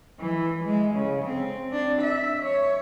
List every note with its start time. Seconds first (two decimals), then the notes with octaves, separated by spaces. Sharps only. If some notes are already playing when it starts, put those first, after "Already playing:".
0.20 E3
0.64 G#3
0.96 C#3
1.26 C4
1.72 D4
2.02 E5
2.43 C#5